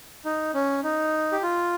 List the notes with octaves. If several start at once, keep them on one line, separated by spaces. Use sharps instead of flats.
D#4
C#4
D#4
G4
F4